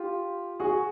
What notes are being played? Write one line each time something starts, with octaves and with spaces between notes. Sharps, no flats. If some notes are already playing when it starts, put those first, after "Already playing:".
Already playing: F4 G4
F#4 G#4